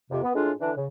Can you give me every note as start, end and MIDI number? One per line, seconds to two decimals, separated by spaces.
0.11 0.21 41
0.11 0.21 48
0.23 0.33 59
0.35 0.52 45
0.35 0.52 56
0.35 0.52 62
0.35 0.52 65
0.60 0.71 50
0.60 0.71 52
0.60 0.71 62
0.76 0.85 49